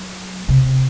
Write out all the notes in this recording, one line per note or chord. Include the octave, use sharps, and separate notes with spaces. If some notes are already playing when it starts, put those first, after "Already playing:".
Already playing: F#3
C3